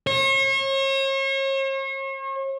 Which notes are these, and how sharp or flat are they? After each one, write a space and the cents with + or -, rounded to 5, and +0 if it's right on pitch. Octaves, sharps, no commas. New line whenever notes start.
C#5 -40